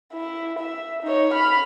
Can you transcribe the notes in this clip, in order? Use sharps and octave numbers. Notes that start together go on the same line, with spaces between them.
E4
E5
D#4 C#5
B5 F6